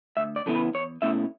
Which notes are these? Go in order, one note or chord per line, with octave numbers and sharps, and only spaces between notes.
D2 E5
D5
C#3 E3 B3 E4 A4
B4
E2 C#5
B2 A3 C#4 E4 E5